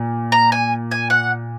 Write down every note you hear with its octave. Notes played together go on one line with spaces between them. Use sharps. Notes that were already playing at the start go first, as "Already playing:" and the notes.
Already playing: A#2
A#5
G#5
G#5
F#5